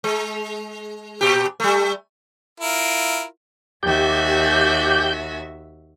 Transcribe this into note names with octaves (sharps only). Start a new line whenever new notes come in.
G#3
A#2 G4
G3 A3
E4 F4 A#4
D#2 F#4 G4 E5 G6